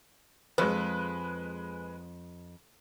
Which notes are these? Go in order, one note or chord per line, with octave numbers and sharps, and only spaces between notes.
F2 G#3 B4